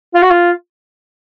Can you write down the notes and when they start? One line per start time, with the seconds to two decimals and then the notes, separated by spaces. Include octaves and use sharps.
0.14 F4
0.22 F#4
0.30 F4